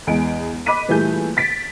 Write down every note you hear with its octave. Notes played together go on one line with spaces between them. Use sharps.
E2 G#3 G#5 D7
D#5 B5 D6 F#6 B6 D#7
A#2 E3 G3 A3 G#4 G6
A6 B6 D7